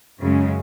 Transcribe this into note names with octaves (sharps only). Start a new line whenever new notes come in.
F#2 C#3 G#3